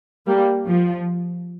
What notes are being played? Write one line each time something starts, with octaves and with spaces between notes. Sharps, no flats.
G3 A#3
F3